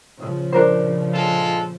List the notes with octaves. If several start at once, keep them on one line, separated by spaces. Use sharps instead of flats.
A#2 C#3 F3
D4 A#4 C5
G#3 F4 A4